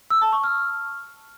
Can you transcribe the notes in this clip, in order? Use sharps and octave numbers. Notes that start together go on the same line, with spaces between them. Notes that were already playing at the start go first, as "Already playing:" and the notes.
E6
A5
C#6
F6